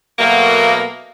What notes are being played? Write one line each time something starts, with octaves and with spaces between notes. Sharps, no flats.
B2 F#3 A3 A#3